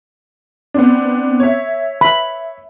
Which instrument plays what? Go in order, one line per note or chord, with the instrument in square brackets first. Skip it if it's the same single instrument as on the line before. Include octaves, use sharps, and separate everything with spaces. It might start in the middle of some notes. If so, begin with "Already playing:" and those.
[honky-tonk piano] B3 C4 D4
C#5 E5
[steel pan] B5